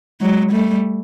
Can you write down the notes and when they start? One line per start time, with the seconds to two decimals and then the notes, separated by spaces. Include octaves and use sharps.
0.21 F#3 G#3
0.52 G3 A3